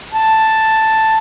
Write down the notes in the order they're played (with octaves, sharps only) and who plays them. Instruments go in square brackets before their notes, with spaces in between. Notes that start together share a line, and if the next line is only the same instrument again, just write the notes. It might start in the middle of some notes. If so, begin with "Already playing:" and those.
[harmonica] A5